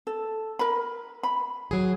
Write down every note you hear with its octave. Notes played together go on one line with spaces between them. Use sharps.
A4
A#4 B5
B5
F#3 G#4